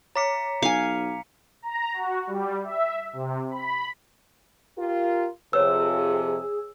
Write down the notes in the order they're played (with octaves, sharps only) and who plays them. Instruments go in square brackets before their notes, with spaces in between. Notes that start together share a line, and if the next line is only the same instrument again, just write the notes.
[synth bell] C#5 D6 [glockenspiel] A#5 B6 C#7
[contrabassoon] B1 [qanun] F5 G#5 [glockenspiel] C#7
[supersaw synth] A#5
F#4
G3
E5
C3
B5
[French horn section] F4 G4 A#4
[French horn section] F2 C3 F3 [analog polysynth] G#4 [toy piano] B4 C#5 [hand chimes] E6